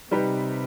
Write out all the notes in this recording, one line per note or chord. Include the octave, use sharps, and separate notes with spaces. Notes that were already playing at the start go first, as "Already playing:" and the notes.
C3 G3 D#4 G4 B4